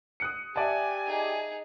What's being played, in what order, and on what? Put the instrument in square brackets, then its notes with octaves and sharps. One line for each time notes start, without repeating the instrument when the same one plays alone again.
[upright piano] D#6 F#6 C#7
[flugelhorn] G4 [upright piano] D5 E5 A5 [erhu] G#5
[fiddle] D#4 G#4